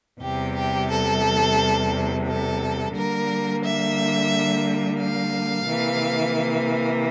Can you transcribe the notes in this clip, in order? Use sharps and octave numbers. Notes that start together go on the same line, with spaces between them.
E2 C3 G3 G4
G4
A4
A4
D3 G3 A#3 A#4
E5
F5
C3 E3 A#3